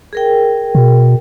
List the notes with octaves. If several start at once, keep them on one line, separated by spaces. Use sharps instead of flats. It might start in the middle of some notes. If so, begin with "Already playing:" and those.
G#4 A#4 G5
B2